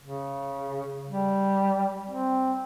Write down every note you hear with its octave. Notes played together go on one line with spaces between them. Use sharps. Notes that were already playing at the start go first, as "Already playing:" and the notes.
C#3
G3
C4